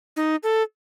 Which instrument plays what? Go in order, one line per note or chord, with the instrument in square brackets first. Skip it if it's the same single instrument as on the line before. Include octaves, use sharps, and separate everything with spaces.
[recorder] D#4
A4